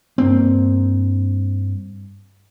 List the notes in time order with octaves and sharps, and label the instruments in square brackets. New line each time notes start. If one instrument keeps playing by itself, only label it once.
[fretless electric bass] G2 A#3 C4